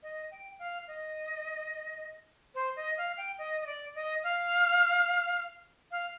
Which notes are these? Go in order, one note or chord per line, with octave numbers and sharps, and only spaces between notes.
D#5
G5
F5
D#5
C5
D#5
F5
G5
D#5
D#5
D5
D#5
F5
F5